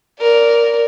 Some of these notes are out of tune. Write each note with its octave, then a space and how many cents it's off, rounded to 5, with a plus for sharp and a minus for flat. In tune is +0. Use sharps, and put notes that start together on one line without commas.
A#4 +0 D5 -15